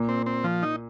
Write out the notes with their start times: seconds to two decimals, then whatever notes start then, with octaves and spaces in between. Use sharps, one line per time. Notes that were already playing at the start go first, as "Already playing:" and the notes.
Already playing: A#2
0.09 C4
0.26 C4
0.44 F3
0.63 D#4